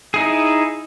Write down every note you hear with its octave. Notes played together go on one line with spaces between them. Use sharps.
D#4 E4 G#4